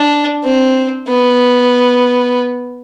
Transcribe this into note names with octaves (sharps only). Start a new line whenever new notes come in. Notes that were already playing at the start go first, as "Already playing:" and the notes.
Already playing: D4
C4
B3